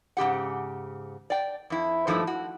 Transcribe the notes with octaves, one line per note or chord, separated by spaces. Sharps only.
G#2 C#3 G4 F#5
D5 G5
F2 E4
G2 F3 A3 A#3 D#4 E4
F#4